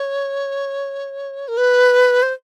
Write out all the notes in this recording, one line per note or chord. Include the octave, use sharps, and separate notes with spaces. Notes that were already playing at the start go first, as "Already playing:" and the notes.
Already playing: C#5
A#4
B4
C5